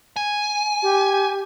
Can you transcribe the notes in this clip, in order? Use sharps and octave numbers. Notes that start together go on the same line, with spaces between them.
G#5
G4